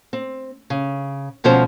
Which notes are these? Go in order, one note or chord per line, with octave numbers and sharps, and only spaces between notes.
C4
C#3
D2 B2 F3 C#4 C5